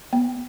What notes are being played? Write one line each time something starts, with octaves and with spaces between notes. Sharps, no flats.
B3